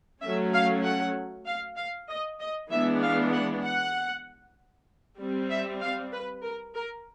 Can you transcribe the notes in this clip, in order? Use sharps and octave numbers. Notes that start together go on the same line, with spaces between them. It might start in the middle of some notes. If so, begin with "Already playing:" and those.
F#3 A3 C#4 E5
F5
F#5
F5
F5
D#5
D#5
E3 G#3 B3 D4 E5
F5
F#5
F#5
G3 C4
E5
F5
B4
A#4
A#4